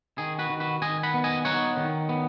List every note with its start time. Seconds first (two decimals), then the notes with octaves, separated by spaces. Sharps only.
0.18 D#3 G#4
0.39 F#4 B4
0.50 D#3
0.60 F#4 B4
0.81 D#3 D#5 G#5
1.03 F#5 B5
1.14 B3
1.24 D#5 G#5
1.45 D#4 C#5 F#5
1.77 D#3
2.09 B3